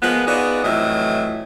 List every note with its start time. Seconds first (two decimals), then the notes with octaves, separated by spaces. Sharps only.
0.03 F3 G#3 A#3 B3
0.27 B3 D#4 F4 F#4 G#4 D5
0.64 F2 A2 E3 F#3 D#5 E5